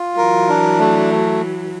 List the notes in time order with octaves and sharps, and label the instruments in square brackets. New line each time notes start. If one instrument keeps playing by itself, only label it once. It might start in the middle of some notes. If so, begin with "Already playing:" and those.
Already playing: [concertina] F4
[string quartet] E3 F#3 [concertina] A#4
[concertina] D4
A3